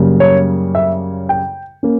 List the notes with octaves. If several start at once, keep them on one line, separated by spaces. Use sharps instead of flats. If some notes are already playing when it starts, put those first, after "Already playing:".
Already playing: F#2 C#3 G3 A#3
C#5
E5
G5
A#3 C#4